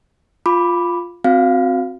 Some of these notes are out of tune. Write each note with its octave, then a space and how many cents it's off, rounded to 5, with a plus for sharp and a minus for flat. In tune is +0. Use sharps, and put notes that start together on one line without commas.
F4 +0 B5 +0 D6 +0
C4 +0 F#4 -25 F5 -5